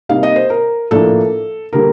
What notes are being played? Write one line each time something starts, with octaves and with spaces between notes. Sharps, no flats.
C3 G3 A#3 D#4 F5
D#5
C5
A#4
A2 F3 A#3 D4 A4
D3 G3 A#3 A#4